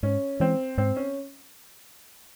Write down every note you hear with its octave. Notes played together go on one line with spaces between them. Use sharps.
G#2 C#4
E3 G#3 C4
G#2 C4
C#4